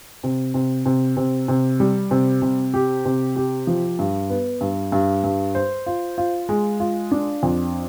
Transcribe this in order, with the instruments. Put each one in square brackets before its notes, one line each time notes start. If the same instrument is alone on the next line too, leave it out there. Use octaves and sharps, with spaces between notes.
[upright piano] C3
C3
C3
C3
C3
G3
C3
C3
G4
C3
G4
F3
G2
B3
G2
G2
G2
C5
F4
F4
G#3
F4
D4
F2